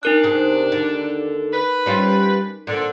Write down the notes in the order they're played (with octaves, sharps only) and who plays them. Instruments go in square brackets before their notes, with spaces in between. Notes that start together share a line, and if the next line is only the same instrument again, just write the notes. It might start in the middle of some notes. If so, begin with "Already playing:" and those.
[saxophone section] D4 [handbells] D#4 A#4 F#6
[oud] C3 G#4
D#2 D3
[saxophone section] B4
[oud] G3 C#4 F4
[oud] A#2 [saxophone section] D3